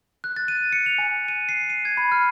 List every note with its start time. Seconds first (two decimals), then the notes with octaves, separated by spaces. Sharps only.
0.24 F#6
0.36 A6
0.48 D#7
0.72 C#7
0.86 F7
0.98 G#5
1.28 D#7
1.49 C7
1.70 D#7
1.85 G#6
1.97 B5
2.12 F6